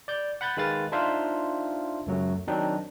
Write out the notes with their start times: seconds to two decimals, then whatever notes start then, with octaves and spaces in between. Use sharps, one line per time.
0.08 D5 G6
0.41 F#5 B5 G6 A6
0.57 D#3 G#3 B4 F5 A6
0.92 D4 D#4 F4 C5 E5 F5
2.06 C#2 F#2 F#3 A3
2.47 D#3 F#3 C4 D4 D#4